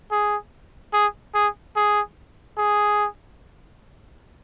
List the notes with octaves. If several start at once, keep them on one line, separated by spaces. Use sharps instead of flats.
G#4
G#4
G#4
G#4
G#4